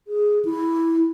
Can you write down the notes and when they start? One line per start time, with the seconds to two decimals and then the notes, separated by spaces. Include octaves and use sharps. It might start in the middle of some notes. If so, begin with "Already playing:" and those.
0.08 G#4
0.45 E4